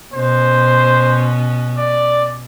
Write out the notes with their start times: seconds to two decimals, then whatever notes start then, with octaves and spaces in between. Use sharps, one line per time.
0.14 B2 C#4 C5
1.78 D5